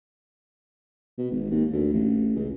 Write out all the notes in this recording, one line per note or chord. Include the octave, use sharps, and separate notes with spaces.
B2
G#1
D#2
D2
A1
C#2